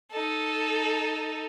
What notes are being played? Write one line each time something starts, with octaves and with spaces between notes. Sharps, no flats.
D#4 A4